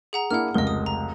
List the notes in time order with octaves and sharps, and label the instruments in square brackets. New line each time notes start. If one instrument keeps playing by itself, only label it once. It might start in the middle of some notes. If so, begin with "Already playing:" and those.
[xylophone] G#4 F#5 A#5
[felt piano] A#3 D4 E4 [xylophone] F#5 F6
[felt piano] F1 C#2 [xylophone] A#4 D#5
[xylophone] D#6
A#5